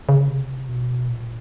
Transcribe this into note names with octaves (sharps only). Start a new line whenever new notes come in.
C#3
C3
B2
A#2